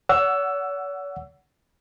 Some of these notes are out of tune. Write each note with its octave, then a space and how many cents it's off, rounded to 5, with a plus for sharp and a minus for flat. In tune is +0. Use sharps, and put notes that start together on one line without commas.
C#5 +45 F#5 +0 E6 +15